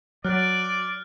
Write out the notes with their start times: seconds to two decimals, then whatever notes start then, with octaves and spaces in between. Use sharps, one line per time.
0.24 F#3 D5 F6 F#6